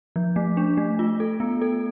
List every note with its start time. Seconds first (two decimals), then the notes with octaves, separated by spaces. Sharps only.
0.16 F3
0.36 A3
0.57 D4
0.77 A3
0.99 F4
1.20 A4
1.40 B3
1.62 A4